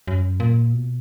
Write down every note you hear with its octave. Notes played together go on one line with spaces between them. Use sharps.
F#2
A#2
B2